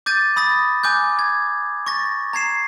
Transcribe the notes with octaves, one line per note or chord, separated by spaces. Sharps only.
D6 G6 A6 D#7
B5 D#6 A6 A#6
G#5 D6 F#6 G6
G#6
C#6 A6 A#6
A#5 G#6 C7 E7